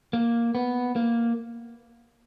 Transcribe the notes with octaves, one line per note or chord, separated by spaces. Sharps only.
A#3
B3
A#3